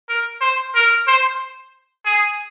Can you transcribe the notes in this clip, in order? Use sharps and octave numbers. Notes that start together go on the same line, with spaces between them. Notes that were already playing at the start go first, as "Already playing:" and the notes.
A#4
C5
A#4
C5
G#4